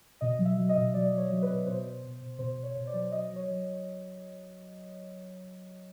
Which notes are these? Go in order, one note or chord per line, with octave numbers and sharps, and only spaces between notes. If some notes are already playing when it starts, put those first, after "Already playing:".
B2 D#5
F#3
E5
F#3
D#5
B2
F#3 D5
F#3
C#5
F#3
B4
B2
B2 C5
B2
B2
B2
B2 C5
B2
C#5
B2
D5
F#3
F#3 D#5
F#3
C#5
F#3